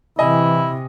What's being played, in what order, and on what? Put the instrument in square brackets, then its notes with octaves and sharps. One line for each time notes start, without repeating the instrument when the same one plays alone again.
[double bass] C3 [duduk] E3 [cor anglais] E4 [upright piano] D#5 G#5